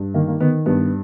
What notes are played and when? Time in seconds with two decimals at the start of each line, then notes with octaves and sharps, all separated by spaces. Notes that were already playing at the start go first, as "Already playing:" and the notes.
Already playing: G2
0.14 D#3 A#3
0.28 A#3
0.40 D#3 B3
0.66 G2 B3